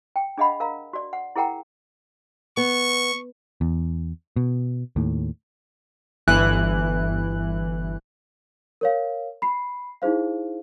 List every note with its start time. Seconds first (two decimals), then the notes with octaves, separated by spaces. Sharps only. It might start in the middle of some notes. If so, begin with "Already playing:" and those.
0.16 G5
0.38 D4 G#4 D#5 F5 F#5 B5
0.60 A#4 F5 A#5
0.93 F#4 D5
1.13 F#5
1.36 E4 G#4 A#4 F#5 G5 A#5
2.57 B3 C#6
3.61 E2
4.36 B2
4.96 D#2 A2
6.27 G1 E3 F#6
8.81 A#4 C#5 F5
9.42 B5 C7
10.02 D#4 E4 G#4 C5 F5